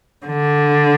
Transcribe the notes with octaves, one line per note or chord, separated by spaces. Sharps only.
D3